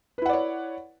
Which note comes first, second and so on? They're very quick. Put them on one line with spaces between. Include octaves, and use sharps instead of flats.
B4 E4 F#5 D5 C#5